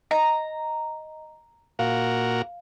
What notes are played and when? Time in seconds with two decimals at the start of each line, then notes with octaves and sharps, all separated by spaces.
0.11 D#5 A#5
1.79 A#2 F#4 A#4 F5